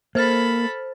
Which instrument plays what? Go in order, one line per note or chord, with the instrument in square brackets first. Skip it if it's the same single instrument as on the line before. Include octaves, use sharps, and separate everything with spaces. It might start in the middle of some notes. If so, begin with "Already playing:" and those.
[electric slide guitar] A#3 [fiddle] A4 B5 [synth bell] C5 F6 A6